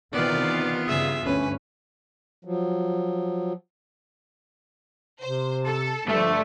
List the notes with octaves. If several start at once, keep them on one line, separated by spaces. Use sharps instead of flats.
C3 D#3 E3 B3 F4 D5 F5
G2 C#3 G#4 E5
D2 G2 C#4 B4
F3 F#3
C3 C5
A4 A5
G2 D3 F3 A3 A4